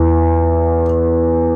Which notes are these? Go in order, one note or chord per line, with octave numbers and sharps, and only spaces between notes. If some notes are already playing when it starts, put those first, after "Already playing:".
Already playing: E2 E3